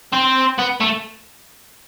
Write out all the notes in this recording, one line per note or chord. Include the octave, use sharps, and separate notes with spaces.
C4
B3
A3